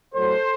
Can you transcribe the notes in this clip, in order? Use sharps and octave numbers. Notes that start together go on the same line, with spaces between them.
A2 F#3 A3 A4 C5